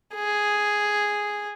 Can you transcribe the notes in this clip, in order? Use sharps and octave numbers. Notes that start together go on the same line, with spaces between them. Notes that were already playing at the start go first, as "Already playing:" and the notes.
G#4